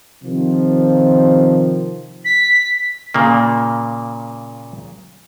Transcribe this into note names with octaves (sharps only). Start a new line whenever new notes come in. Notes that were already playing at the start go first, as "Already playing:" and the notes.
C3 D#3 F3
B6
A#2 C#3 A#3